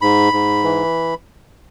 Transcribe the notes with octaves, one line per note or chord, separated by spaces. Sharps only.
G#2 B5
G#2
E3